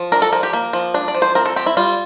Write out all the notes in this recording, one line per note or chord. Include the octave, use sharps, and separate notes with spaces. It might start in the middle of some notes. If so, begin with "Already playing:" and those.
Already playing: F3
D4 A#4
A4
F3 A#4
G4
A#3
F3
D4
D5
F3
C5
C4 A#4
A4
C4 G4
E4
G3 F4